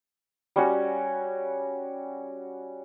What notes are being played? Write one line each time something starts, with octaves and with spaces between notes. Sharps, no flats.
G3 C#4 F#4